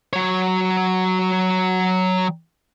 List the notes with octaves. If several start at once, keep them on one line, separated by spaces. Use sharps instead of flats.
F#3 C#5